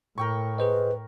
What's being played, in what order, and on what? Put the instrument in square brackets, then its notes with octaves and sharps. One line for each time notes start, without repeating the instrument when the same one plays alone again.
[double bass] A2 [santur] A#4 G5 C#6
[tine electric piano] G#4 C5 D#5 [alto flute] B4